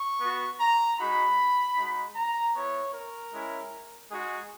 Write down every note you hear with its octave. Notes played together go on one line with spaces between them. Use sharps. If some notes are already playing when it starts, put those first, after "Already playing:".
Already playing: C#6
B3 F#4
A#5
G#3 D#4 F#4 B5
G#3 D#4 F#4
A#5
B3 E4 C#5
A#4
G#3 C#4 E4
G#3 D#4 F#4 G#4